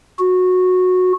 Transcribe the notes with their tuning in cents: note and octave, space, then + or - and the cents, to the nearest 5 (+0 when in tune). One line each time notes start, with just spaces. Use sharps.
F#4 -15